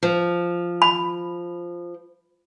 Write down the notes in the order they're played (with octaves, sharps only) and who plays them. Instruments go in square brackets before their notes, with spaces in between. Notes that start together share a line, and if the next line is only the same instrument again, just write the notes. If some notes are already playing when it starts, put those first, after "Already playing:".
[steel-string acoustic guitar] F3
[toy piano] B5